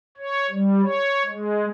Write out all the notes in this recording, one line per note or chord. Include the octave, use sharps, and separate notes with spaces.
C#5
G3
C#5
G#3